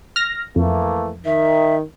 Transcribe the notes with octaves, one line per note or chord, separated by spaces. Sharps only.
F6 A#6
F2 E3 A3 A#3
D#3 E5